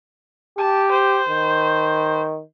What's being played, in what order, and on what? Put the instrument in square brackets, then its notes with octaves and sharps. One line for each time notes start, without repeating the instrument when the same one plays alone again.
[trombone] G4 [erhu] A5
[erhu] C5
[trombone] D#3